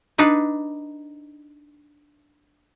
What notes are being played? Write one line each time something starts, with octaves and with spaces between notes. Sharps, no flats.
D4 D#4 B4